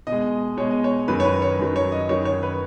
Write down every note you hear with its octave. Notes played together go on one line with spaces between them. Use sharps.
B2 D#5
G#3
B2 G#3 C#5
D#5
C#5
F#2 D#3 F#3 B4
C#5
B4
C#5
F#2 D#3 F#3
C#5
D#5
F#2 D#3 F#3 C#5
C#5
B4